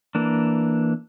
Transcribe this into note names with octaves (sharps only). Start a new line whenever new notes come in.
E3 A#3 D4